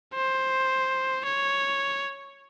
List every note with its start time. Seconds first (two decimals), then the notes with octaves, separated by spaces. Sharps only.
0.14 C5
1.25 C#5